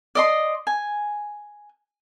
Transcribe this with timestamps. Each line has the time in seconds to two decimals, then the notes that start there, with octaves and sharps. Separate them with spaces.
0.15 D5 D#5 C6
0.67 G#5